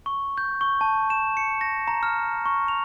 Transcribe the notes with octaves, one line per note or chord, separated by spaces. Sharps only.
C#6
G6
C#6
A5
E7
C#7
A#6
A#5
F6
C#6
F7